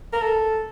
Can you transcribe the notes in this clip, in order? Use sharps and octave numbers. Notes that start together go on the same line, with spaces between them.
A#4
A4